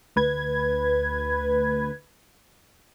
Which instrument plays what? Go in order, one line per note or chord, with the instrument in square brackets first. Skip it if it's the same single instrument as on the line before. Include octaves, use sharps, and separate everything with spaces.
[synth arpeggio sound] D2 B4 G#6